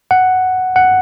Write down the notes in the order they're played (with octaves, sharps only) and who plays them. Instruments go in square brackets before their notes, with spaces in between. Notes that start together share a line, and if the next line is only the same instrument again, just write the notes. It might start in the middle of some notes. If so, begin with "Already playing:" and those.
[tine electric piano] F#5
F#5